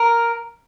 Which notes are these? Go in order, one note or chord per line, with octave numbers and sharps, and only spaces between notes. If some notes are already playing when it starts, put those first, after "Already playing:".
Already playing: A#4